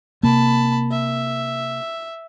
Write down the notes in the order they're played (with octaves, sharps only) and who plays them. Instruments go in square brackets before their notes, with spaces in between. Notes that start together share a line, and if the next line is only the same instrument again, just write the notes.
[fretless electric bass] C3 A#3 [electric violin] A5 B5
[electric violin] E5